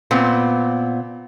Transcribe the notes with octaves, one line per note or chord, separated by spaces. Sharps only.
A#2 B3 C4